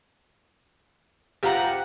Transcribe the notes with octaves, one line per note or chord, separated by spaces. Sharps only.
F#1 F4 G4 F#5 A#5